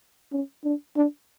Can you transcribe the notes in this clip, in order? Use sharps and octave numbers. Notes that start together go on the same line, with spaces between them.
C#4
D4
D4